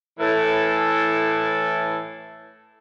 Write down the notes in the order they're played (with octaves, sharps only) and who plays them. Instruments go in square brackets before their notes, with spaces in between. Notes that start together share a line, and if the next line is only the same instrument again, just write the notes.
[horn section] A2 E3 A4